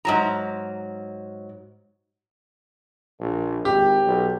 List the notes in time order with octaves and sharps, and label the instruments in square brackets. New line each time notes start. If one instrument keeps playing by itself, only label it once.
[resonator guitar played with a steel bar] G#2 F#3 A#5
[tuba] A#1
[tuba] G#1 [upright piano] G4
[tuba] B1